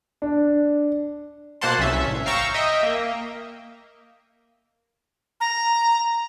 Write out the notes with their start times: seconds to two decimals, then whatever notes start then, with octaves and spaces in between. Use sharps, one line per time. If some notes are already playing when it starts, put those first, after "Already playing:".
0.22 D4
1.61 B2 A#3 C5 F#5 A5 C6
1.79 C2 C#4 E5
2.05 A1
2.26 F5 G5 A#5 C#6 E6
2.54 D#5 E5 G5
2.83 A#3
5.41 A#5